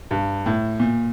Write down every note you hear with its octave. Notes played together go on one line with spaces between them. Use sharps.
G2
A2
A#2